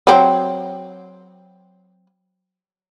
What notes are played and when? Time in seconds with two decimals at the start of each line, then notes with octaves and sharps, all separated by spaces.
0.07 F#3 C4